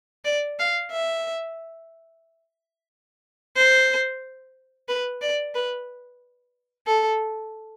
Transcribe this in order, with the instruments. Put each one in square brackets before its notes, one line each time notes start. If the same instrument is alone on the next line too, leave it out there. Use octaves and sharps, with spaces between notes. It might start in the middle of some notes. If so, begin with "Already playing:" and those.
[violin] D5
F5
E5
C5
B4
D5
B4
A4